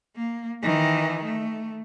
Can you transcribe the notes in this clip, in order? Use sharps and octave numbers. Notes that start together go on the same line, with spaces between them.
A#3
D#3 E3
A3